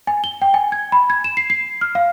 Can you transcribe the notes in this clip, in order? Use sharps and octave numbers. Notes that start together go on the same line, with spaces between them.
G#5
G7
G5
G#5
G#6
B5
G#6
E7
C7
C7
F6
F5